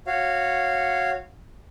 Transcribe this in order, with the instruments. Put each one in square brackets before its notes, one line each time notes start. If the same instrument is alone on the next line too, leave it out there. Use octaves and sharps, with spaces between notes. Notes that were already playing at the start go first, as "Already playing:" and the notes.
[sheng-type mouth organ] F#4 C#5 F5